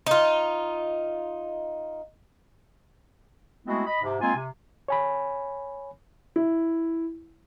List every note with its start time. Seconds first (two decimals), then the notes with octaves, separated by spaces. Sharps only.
0.07 D#4 F4
3.66 G#3 A3 B3 C4 E4 F#4
3.87 D#5 B5
4.02 G#2 C3
4.21 G#3 A#3 C4 F4 G#5
4.36 C3
4.88 C#5 G#5 B5
6.36 E4